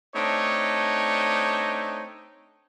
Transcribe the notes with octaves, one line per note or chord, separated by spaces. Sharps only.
A3 C4 D4 D#4 C#5